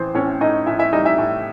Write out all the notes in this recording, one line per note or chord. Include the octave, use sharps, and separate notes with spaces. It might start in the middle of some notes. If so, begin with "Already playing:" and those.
Already playing: A1 E3 C5
A2 C#4 C#5
A2 D#4 D#5
A2 E4 E5
E4 E5
G3 D#4 D#5
E4 E5
A2